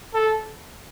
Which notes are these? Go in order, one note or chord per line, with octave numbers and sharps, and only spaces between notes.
A4